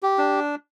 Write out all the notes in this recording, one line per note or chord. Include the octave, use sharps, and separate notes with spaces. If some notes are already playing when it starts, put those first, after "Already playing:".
G4
D4